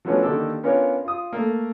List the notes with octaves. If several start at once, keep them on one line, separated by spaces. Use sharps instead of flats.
F3 F#3 A3 B3 C#4 D4
D3 D#3 A#3 D4 G4 A4
B3 C#4 D4 F4 A#4 C#5
F4 D#6
A3 A#3